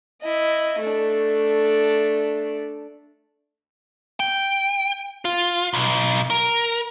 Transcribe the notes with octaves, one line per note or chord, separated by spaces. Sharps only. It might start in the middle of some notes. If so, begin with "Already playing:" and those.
E4 D#5
A3 D4
G5
F4
B1
A#4